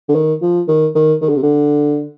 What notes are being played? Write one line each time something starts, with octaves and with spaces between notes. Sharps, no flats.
D3
D#3
F3
D#3
D#3
D#3
D3
C3
D3